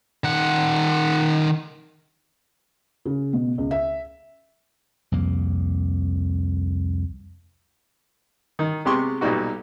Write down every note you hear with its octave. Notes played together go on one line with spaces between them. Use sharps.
D#3 F#5
C#3
B2
C#2
E5
C2 F2 A#3
D#3
C3 G#3 B3 G4 C6 C#6
B1 A#2 G3 D#4 F#4